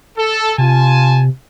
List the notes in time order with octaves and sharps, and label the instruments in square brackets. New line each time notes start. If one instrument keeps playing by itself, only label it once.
[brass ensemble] A4
[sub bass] C3 [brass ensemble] F4 G#5 A5